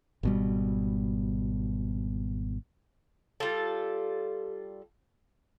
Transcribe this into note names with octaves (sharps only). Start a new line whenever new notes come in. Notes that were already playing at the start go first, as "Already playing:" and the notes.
G#1 B2 G3
G3 F4 A4